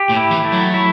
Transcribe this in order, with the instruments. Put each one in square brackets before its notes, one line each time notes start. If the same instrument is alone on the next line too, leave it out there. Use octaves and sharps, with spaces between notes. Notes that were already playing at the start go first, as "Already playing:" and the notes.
Already playing: [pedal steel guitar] G4
[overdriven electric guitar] A2
[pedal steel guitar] E4
[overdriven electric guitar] E3
[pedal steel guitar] A3
[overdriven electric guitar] F#3
[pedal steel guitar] E4